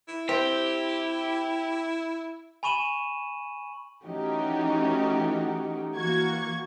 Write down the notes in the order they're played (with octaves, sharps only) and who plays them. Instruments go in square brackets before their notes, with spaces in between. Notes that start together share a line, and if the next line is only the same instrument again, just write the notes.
[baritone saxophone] E4
[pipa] C4 [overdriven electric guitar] G4
[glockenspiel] G#5 B5 C#6 D#7 E7 F#7
[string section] E3 A3 C#4 D#4 F#4 G4
E3 A#3 F#4 C#6 G#6